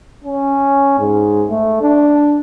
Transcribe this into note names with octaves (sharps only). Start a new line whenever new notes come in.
C#4
G#2
A3
D4